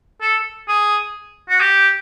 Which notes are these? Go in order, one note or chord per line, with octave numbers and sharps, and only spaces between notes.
A4
G#4
F#4
G4